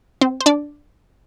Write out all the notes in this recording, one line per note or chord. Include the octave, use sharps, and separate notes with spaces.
C4 C5
C5
D4 D5